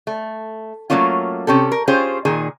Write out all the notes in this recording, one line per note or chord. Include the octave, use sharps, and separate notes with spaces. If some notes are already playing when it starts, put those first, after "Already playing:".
A3
F#3 G3 A3 A#3 C#4 F4
C3 C#4 G4 A4
A#4
C#4 F4 G4 G#4 C5
A#2 D#3 G#4